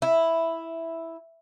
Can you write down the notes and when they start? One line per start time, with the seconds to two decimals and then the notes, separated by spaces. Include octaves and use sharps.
0.02 E4